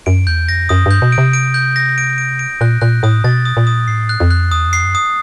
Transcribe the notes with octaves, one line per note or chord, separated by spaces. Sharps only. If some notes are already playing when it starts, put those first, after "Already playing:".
F#2 D7
E2 G6
F2 A#6
F#2 D#6
G2 G6
B2
D7
C3
D7
G6
A#6
D7
D7
D7
A#2 F#6
A#2 F#6
A2 D#6
B2 A6
D#6
A#2
D#6
A2 C7
F#6
F2
F#6
E2 D#6
F2
C7
F#2
D#6